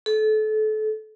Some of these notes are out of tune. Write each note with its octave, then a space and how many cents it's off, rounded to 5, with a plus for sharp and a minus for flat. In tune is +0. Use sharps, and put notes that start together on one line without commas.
A4 -30